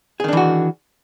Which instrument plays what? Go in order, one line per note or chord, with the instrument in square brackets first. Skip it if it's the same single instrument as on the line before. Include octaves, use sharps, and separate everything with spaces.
[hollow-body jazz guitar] G#4
D#3
D4
E3
F#4